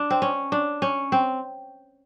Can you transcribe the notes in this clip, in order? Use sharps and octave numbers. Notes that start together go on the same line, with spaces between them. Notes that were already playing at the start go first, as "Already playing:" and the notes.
Already playing: D4
C4
C#4
D4
C#4
C4